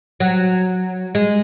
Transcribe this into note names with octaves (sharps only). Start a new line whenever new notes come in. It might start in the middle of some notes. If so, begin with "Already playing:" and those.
F#3
G#3